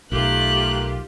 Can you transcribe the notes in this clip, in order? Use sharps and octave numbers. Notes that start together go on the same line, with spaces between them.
B1 A3 F4 G4 A#4 F#6